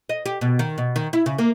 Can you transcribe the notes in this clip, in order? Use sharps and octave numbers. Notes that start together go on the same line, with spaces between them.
D#5
G4
B2
D#3
B2
D#3
E4
C#3
A#3